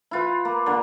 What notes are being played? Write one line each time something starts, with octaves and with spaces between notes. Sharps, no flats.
E4 F4 B4
A#3
D3 A#3